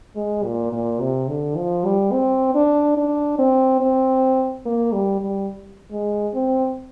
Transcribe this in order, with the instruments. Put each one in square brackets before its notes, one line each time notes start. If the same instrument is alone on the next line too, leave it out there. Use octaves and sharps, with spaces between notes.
[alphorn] G#3
A#2
A#2
C3
D3
F3
G3
C4
D4
D4
C4
C4
A#3
G3
G3
G#3
C4